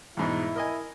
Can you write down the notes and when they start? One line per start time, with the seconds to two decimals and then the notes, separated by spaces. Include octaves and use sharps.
0.17 E2 G#2 B2 E4
0.56 A#4 D#5 G#5